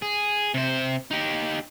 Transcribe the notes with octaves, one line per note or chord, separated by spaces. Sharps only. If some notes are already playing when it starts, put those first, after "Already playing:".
G#4
C3 C5
D#4 G4